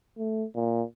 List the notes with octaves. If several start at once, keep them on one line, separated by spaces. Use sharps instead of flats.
A3
A#2